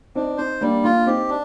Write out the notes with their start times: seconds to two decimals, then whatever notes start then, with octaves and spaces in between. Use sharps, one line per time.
0.15 C4 D4 D#4
0.38 C4 D#4 C5
0.61 G3 A#3 D4
0.83 A#3 D4 F4
1.06 C4 D#4 G4
1.29 D4